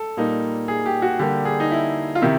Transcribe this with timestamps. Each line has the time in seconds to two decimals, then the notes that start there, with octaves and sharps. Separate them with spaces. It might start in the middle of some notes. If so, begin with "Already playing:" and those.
Already playing: A4
0.17 A#2 G3 A#3 D#4
0.68 G#4
0.86 G4
1.02 F#4
1.19 D3 G3 A#3 G4
1.45 G#4
1.60 D#4
1.71 E4
2.15 F4
2.22 C3 D#3 E4